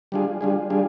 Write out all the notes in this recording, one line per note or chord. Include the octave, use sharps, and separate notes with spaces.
G3 D4 F4 G#4
G3 D4 F4 G#4
G3 D4 F4 G#4